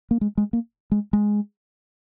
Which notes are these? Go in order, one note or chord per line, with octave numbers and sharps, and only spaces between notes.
A#3
G#3
G#3
A#3
G#3
G#3